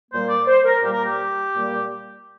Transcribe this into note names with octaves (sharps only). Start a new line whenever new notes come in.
A#2 G3 A#3 C5
D5
C5
A#4
A#2 G3 A#3 G4
A#4
G4
A#2 G3 A#3